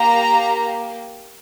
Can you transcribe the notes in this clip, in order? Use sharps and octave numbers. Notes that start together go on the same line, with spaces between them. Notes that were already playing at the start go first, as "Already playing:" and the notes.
Already playing: A#3 G4 A#5